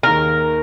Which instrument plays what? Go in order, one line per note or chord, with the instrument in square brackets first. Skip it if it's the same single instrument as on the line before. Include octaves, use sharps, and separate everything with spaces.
[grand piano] D#2 D#3 A#3 D#4 G#4 [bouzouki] A#4